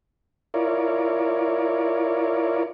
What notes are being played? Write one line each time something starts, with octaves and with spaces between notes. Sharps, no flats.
E4 F4 A#4 C#5 D5